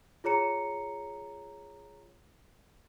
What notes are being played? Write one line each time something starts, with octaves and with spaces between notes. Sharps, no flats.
F4 G#4 C#5 A#5 C#7